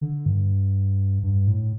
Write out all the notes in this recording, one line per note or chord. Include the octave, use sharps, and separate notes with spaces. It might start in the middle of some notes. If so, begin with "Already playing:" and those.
D3
G2
G2
A2